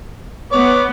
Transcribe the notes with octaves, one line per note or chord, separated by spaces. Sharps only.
B3 C#5 D6